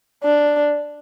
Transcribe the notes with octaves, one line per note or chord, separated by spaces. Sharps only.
D4